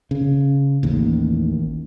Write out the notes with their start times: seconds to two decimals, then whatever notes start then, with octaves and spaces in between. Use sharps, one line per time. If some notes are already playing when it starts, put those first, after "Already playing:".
0.11 C#3
0.83 A1 D#2